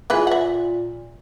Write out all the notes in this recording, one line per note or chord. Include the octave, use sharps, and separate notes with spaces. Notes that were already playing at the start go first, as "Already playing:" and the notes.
A#2 E3 G#3 B4
E5 F#5